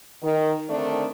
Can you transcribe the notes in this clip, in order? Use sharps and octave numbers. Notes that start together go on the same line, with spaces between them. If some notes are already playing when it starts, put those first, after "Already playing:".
D#3
D3 D#3 A3 C4 D4